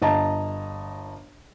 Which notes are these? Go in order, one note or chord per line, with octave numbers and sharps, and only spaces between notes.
G1 D#5 A5 A#5